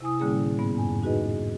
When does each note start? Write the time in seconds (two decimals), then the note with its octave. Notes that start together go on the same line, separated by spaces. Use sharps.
0.01 C3 E4 G#5 D#6
0.20 A2 D3 G3 A#3 C#4 G#4
0.59 G#2 B3
0.75 F2 G#5
1.02 D#4 F#4 G#4 B4 D#5